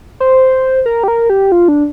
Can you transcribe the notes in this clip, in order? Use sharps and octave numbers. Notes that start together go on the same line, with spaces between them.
C5
A#4
G4
A#4
G4
F4
D4